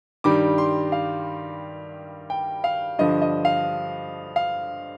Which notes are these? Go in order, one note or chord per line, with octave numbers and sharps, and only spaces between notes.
G2 D#3 G3 D6
C6
F5
G5
F5
G2 D3 F3 D#5
D#5
F5
F5